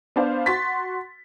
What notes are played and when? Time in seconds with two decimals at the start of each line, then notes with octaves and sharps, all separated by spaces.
0.16 B3 D4 C5 F5
0.46 F#4 C6 A6 B6